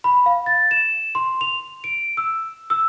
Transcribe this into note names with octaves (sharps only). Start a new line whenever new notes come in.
B5
F5
A6
E7
C6
F7
D7
E6
E6